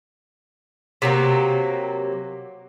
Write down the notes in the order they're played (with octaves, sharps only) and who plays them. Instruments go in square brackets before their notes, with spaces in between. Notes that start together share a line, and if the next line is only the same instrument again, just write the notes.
[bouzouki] C3 F#3 A#3